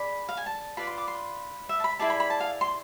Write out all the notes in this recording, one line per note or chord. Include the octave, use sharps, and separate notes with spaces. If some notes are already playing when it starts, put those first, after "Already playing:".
Already playing: G#4 D5 B5
F5
G#5
A5
F4 B4 D5 B5
C6
D6
C6
E5
A5
B5
E4 G#4 D5 A5
B5
B5
A5
F5
C6